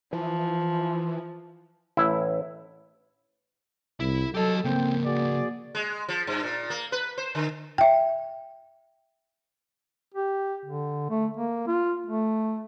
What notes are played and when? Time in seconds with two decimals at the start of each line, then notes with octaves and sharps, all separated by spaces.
0.13 E3 F3
1.97 A1 E4
4.00 C2 E4
4.35 F#3 G4 A4 D#5
4.64 C#3 F3 A#3 C4 G5
5.05 F#4 G#4 D5
5.75 G#3
6.08 F3
6.27 G2
6.43 A#2
6.70 A#3
6.92 B4
7.18 C5
7.35 D3
7.78 E5 G5
10.14 G4
10.65 D3
11.10 A3
11.37 A#3
11.67 F4
12.06 A3